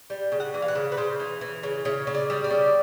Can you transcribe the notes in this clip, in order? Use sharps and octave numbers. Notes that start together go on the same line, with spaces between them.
G3
C#3
F#5
E3
F5
F#5
C#3
B4
C#3 C5
E3
E3
C#3
C#3 C#5
C#3
D5
G3
D5
C#3